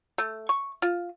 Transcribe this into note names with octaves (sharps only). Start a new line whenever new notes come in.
A3
C#6
F4